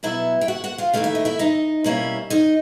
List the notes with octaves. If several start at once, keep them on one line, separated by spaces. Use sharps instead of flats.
B2 F#3 B3 E4 E5
G5
F#4 F#5
F#4 F#5
F4 F5
D#2 C#3 E3 A3 F5
E5
D#5
E4 E5
D#4 D#5
B2 G3 A#3 C#4 E4
D#4 D#5